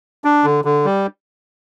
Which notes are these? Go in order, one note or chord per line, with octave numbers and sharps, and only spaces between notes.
D4
D3
D3
G3